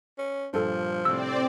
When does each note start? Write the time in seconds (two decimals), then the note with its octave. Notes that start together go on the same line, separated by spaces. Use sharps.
0.18 C#4
0.54 G2 A#2 F3 D4 A4
1.05 A2 C3 C4 D5 E6